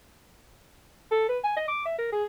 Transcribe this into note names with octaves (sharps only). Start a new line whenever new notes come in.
A4
B4
G#5
D#5
D6
E5
A#4
G#4